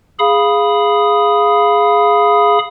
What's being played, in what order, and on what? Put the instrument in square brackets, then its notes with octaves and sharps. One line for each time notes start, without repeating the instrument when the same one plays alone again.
[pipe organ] G#4 F5 B5 D#6